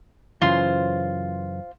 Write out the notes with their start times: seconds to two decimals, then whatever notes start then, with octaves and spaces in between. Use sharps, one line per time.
0.41 F#2 C#3 E3 F4 C5